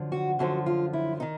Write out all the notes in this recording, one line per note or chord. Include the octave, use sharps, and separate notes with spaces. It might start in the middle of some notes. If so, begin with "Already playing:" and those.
Already playing: F#2 D3 F3
F#4
F#2 D3 F3 F#4
F4
E4
D#3 D#4